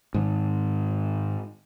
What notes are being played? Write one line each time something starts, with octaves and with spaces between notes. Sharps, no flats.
G#2 D#3